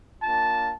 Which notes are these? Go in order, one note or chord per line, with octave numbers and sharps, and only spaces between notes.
A#3 D4 F4 A5